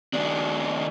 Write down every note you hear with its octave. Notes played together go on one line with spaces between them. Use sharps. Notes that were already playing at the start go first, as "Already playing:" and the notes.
D#2 D4